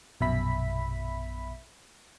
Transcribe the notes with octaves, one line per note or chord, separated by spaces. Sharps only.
A#1 F#2 B2 E5 B5 B6